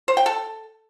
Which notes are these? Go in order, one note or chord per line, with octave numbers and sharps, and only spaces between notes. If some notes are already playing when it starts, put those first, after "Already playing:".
C5
G5
A4